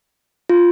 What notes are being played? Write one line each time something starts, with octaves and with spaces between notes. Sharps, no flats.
F4